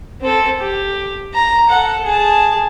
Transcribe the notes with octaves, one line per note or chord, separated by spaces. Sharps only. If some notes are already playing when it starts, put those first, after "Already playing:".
C4 A4
G4
A#5
A4 F#5
G#4 A5